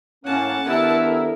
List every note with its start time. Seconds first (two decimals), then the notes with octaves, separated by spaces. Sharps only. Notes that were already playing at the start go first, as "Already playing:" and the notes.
0.25 A2 A#3 C#4 F#5 A5
0.65 G2 D#3 B3 E4 A4 A#4